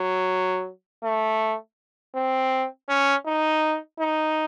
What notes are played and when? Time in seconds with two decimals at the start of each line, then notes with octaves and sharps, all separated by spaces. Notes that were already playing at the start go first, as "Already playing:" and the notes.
Already playing: F#3
1.04 A3
2.15 C4
2.89 C#4
3.26 D#4
4.00 D#4